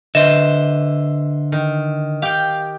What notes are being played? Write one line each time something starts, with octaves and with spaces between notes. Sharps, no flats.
D3 B4 C5 D#5 E5 E7
D#3
G4 F5 G5